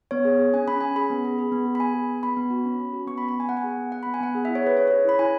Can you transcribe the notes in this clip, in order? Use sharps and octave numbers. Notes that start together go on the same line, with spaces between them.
B3 C#5
G#4
G#4
C#4 G#5
C#4 B5
C#4 G#5
G#4 B5
B3
G#4
G#4
B3
G#4
B5
B3 G#5
G#4
B3
B3 B5
B3
F#4
C#4
C#4
F#4
B3 C#6
B5
B3
B5
B3 G#5
B3 F#5
G#5
G#4
B3
B3 F#5
B3 B5
G#5
B3 F#5
G#4
E4 E5
C#5
G#4 B4
C#4 C#5
G#4 C#5
E4 B5
E4 G#5